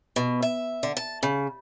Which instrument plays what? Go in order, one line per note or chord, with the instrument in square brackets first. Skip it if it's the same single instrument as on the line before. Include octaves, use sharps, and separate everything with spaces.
[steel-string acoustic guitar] B2
E5
D3
A5
C#3